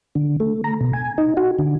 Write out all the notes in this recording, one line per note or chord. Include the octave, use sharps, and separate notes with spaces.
D3
A3
A#5
B2
G#5
D#4
F#4
D3